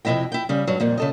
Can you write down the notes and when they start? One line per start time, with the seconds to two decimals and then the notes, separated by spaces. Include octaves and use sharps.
0.05 F2 C3 E3 E4 D#5 G5
0.32 E4 G5
0.49 C#3 G3
0.67 G2 F#3
0.80 F2 A#2 G3
0.97 C#3 A4 D#5